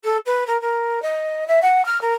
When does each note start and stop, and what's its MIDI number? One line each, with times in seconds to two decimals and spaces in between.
0.04 0.17 69
0.25 0.46 71
0.47 0.60 70
0.61 1.01 70
1.02 1.46 75
1.47 1.59 76
1.62 1.84 78
1.85 2.00 89
2.01 2.14 70